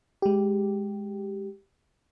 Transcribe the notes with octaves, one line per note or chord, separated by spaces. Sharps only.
G#3 G4